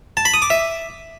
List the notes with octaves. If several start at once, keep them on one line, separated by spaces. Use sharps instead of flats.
A5
B5
D#6
D6
E5